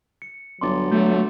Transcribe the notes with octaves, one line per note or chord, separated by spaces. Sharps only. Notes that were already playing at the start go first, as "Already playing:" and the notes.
C#7
G1 F#3 C6 D6 A6
F#3 A3 G6